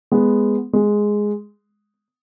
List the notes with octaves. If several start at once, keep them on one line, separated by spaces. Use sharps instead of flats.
G#3 B3
G#3